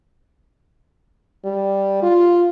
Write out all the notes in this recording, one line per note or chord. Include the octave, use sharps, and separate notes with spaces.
G3
F4